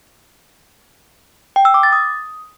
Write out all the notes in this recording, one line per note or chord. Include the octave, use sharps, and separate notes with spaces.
G5
E6
D6
A6
D#6